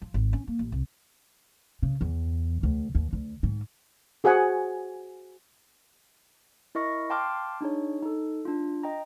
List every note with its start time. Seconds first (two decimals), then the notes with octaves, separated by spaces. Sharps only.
0.02 F3
0.14 G#1
0.33 C#4
0.48 A#3
0.59 A1
0.72 C2
1.82 C#3
2.01 E2
2.63 D2
2.95 D#2
3.13 D2
3.43 G#2
4.24 F#4 G#4 C5 F#5 G#5
6.75 E4 A#4 D#5 C#6 A#6
7.10 F5 G5 A5 C6 D6 F6
7.61 D4 D#4 G#4 C#5
8.03 D#4 A4
8.45 D4 F4
8.83 D#5 G5 A#5